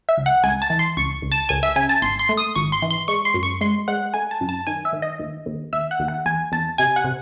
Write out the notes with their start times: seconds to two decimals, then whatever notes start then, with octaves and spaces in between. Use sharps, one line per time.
0.09 E5
0.17 C#2
0.26 F#5
0.44 C#2 G#5
0.62 A5
0.70 E3
0.79 C6
0.97 C#2 C#6
1.22 C#2
1.32 A5
1.49 C#2 G#5
1.63 E5
1.76 C#3 G#5
1.89 A5
2.02 G#1 C6
2.19 C6
2.29 A3
2.37 D#6
2.55 G#1 C#6
2.72 C6
2.82 E3
2.91 C6
3.08 G#3 C#6
3.25 C6
3.34 F#2
3.43 C#6
3.61 G#3 C6
3.88 G#3 F#5
4.14 A3 G#5
4.31 A5
4.41 F#2
4.49 A5
4.67 D#3 G#5
4.85 E5
4.93 D#3
5.02 D#5
5.19 D#2
5.46 D#2
5.73 D#2 E5
5.91 F#5
5.99 D#2
6.08 F#5
6.25 E2 G#5
6.52 E2 A5
6.78 C3 G#5
6.96 F#5
7.04 C3